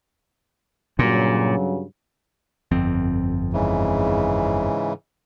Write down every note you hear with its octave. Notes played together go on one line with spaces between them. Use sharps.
G2 A#2 C#3 F#3
G1 F2 C4
G#2 C#3 E3